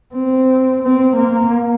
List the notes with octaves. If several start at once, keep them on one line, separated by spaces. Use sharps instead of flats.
C4
C4
A#3